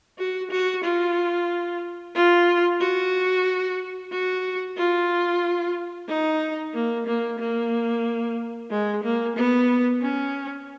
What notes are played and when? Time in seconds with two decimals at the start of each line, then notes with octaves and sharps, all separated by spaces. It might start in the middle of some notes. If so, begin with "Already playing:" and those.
0.18 F#4
0.51 F#4
0.84 F4
2.15 F4
2.81 F#4
4.12 F#4
4.77 F4
6.08 D#4
6.74 A#3
7.07 A#3
7.39 A#3
8.71 G#3
9.03 A#3
9.37 B3
10.02 C#4